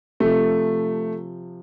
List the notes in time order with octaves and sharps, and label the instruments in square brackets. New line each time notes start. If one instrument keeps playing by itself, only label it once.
[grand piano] C3 F3 A3